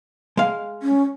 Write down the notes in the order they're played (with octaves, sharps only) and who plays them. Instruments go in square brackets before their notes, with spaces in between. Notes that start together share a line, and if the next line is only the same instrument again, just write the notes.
[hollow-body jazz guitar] G#3 F5
[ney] C#4